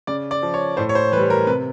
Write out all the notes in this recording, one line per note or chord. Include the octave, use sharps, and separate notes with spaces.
C#3 D5
D5
F3
C#5
A2 C5
C#5
C5
E3 G3 B4
A#4
C3 B4